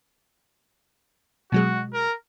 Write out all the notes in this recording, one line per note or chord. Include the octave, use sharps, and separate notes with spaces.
B2 F#3 G#3 F#4
A#4